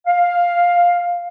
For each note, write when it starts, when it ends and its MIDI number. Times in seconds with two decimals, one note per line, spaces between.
0.07 1.27 77